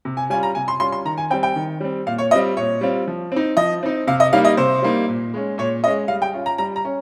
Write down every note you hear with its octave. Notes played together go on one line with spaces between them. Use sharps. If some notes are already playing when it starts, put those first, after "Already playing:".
C3
G#5
G3 C#4 F4 G#5
A#5
C3 G#5
C6
G3 C#4 F4 C6
C6
D#3 A#5
G#5
G3 C4 G5
G5
D#3
G3 C4
A#2 F5
C#5
G3 C4 F4 D#5
A#2 C#5
G3 C4 F4
F3
C4 D#4
F3 D#5
C4 D#4
C3 F5
D#5
G3 A#3 D#4 F5
D#5
C3 C5
G3 A#3 D#4
A#2
G#3 C#4
A#2 C#5
G#3 C#4 D#5
G3 F5
G5
C#4 F4
A#5
G3 A#5
A#5
C#4